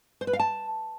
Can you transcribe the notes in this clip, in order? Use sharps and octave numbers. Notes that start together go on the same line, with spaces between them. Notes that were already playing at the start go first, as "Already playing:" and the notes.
C5
B4
F5
A5